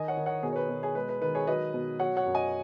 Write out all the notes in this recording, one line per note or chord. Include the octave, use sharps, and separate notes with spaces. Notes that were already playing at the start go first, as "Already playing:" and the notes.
Already playing: D#3 D#5 G#5
C#5 F#5
D#3
C#5 F#5
B2 G#4
C#5
B4
B2
G#4 C#5
G#3 B4
B4
D#3 B4
G#4 C#5
F#3 B4 D#5
B2
F#3 C#5 F#5
C#5 F#5
F#2
D#5 G#5